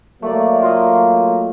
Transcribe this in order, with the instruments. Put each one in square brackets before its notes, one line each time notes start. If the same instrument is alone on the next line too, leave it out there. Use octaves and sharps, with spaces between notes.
[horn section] F#3 A#3 [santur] A3 D5
[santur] F4 D#5